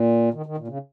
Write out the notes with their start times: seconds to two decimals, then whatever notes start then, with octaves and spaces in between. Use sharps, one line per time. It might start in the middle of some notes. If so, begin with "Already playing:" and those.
Already playing: A#2
0.34 D#3
0.46 D#3
0.58 A#2
0.68 C#3